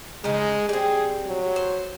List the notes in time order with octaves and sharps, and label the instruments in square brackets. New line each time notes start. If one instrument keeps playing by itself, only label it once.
[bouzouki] C#3 D#4 [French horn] G#3
[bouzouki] G3 C4 [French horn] G#4
[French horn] F#3
[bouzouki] C5